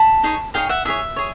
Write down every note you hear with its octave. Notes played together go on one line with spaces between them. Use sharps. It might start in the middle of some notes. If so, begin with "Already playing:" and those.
Already playing: A5 B5
D#4 G#4 C#5
D#4 G#4 C#5 F5 G5
E5 F#5
E4 G#4 C#5 E5
G#4 C#5